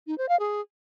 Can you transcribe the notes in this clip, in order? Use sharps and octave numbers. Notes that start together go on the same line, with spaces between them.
D#4
C5
F5
G#4